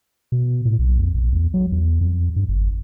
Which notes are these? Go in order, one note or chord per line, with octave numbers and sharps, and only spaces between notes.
B2
A2
B1
F2
A#1
E2
F#3
E2
F2
G2
G1